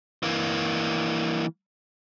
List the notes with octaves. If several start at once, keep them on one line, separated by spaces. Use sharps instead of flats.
E3 A#3